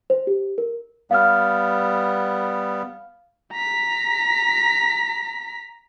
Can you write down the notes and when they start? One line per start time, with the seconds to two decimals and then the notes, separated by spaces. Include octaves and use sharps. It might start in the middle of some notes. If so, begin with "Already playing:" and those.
0.10 C5
0.27 G4
0.58 A#4
1.11 G3 B3 F5 F6
3.53 A#5 B6